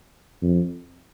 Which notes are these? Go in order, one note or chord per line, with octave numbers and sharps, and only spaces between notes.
F2